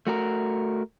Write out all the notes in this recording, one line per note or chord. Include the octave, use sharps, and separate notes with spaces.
A3 F#4 A#4